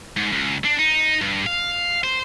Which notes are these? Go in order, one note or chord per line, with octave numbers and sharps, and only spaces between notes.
G#2
C#2
D4
D#4
G2
F5
C5